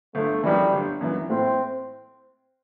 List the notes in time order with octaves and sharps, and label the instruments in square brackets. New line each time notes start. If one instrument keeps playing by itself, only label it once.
[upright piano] G1 [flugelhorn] A3
[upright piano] F#2 E3 [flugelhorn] G3
[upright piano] G1
F#2 E3
[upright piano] A2 [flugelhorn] C4